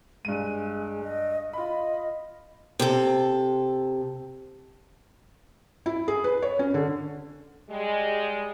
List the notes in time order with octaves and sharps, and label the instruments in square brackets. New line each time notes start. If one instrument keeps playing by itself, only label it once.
[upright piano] G2 D#7 [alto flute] G#3
[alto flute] D#5
[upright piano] F4 B5 [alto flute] D#5
[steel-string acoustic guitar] C3 A4
[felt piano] E4
G#4
B4
C#5
C#4
D3
[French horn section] G3 G#3